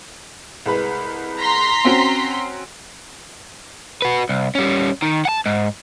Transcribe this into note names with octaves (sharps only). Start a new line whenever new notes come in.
C2 G#3 B4
A#5 C6 B6
C4 C#4 F#4
F#4 B4
C2
G3 C#4
D#3
F#5 A5
G#2